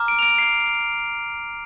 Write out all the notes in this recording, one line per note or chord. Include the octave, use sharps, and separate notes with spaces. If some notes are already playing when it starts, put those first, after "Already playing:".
Already playing: A#5 D6 F6
D7
F7
D7
C7